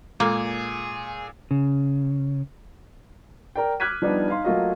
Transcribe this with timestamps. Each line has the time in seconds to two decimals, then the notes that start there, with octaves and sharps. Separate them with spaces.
0.20 A#2 G#3 A#3 G#4 A4
1.51 C#3
3.56 A#4 D5 G5
3.80 D6 F6 F#6 G#6 B6 D#7
4.02 F3 G3 B3 D4 D#4
4.28 D#4 D#5 F5 C6
4.45 F#3 A3 A#3 F4 F#4 D#5